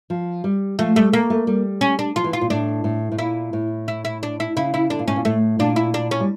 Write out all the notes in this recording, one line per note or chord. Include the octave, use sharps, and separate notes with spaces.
F3
G3
F3 A3
G3 A3
A3 A#3
A3
G3
C#4
D4
F3 F4
E3
F4
A#2
A2 D4
A2
A2
A#2 E4
A2
E4
E4
D4
E4
C#3 E4
E4
D3 D4
A#2
A2 C#4
A#2
A2 A3
A#2 D4
E4
D4
C#4
G3